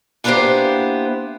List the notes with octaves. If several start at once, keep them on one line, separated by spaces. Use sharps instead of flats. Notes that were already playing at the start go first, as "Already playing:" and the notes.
A#3 B3 D4 E4 G4 C5